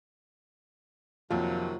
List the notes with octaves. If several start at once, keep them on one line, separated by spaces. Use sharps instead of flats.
F2 C3 D#3 F#3 A#3 F4